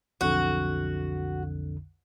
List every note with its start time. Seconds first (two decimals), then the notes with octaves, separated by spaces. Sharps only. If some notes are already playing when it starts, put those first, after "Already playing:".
0.21 B1 F2 D3 F#4